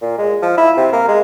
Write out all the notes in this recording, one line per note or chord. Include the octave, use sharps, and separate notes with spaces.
A#2
G#3
F3
E4
C3
A#3
G#3